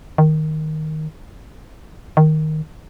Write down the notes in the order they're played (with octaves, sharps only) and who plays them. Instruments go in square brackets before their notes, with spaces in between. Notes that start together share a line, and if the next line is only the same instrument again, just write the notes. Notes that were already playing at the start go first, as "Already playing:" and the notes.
[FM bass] D#3
D#3